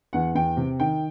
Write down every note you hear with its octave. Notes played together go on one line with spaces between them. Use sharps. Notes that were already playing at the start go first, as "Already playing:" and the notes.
E2 F#5
E2 G5
C3
D#3 G5